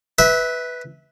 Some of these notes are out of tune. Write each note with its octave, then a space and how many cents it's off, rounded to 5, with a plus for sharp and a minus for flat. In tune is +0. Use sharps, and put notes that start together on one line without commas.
B4 +0 E5 -25